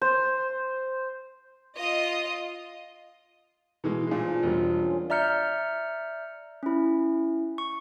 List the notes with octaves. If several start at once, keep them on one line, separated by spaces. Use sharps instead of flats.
C5
F4 D#5
B2 E3 G#3
G2 A#2 G#3 E5 G#5
F3 D4
E1 G3
C#3 A#3 F4
D5 E5 A#5 F6 G6 C#7
C#4 E4
C#6